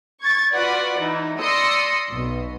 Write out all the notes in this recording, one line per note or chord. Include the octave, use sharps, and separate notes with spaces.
C#6 G#6 A6
F4 F#4 B4 D5 F#5
E3 D#4
D5 C6 D#6 E6 A#6 C#7
B1 B2